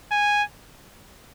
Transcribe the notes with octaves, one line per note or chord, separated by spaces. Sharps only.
G#5